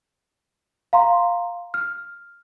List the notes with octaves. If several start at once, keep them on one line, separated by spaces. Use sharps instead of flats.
F5 A#5 C6
F6